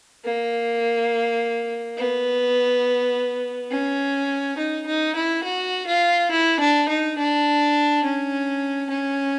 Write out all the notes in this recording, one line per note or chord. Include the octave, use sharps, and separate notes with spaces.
A#3
B3
C#4
D#4
D#4
E4
F#4
F4
E4
D4
D#4
D4
C#4
C#4